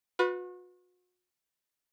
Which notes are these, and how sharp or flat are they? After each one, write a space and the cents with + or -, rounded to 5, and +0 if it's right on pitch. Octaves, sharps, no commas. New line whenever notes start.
F#4 -40 B4 +0